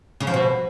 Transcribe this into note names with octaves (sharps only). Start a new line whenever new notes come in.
C#3
F3
B2